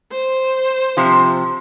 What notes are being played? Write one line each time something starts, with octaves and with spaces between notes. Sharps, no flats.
C5
C3 F3